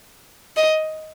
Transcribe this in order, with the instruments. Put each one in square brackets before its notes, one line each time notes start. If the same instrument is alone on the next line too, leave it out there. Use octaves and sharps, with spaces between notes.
[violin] D#5